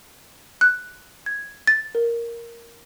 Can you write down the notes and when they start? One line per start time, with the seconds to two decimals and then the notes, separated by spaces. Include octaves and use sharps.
0.61 F#6
1.26 G#6
1.67 A6
1.95 A#4